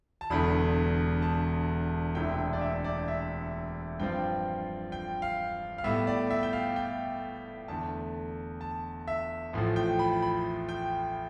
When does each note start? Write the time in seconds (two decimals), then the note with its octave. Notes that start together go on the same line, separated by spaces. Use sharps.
0.21 A5
0.30 E1 E2 D3 B5
1.22 A5
2.15 E1 D2 C3 E3 G5
2.38 G5
2.53 D5
2.61 E5
2.84 D5
3.08 E5
4.00 G2 F3 C4 F4 G5
4.92 G5
5.22 F5
5.78 F5
5.84 A2 G3 B3 E5
6.07 D5
6.31 E5
6.43 G5
6.53 F5
6.76 G5
7.68 E2 D3 A3 A5
8.61 A5
9.08 E5
9.53 A1 A2 F3
9.76 G5
9.99 B5
10.22 B5
10.69 G5